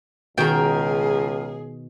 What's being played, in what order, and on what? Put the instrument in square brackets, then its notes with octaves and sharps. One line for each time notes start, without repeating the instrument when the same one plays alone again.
[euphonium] C#2 [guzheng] B2 D#3 F#4 [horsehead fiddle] G#4 [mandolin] A#4 G5